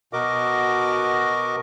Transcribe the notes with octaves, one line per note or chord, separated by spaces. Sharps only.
B2 F#4 A#4 D#5 D6